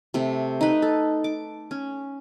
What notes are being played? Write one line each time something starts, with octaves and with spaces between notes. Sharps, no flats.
C3 A3
D#4 B4
A4
D6
C#4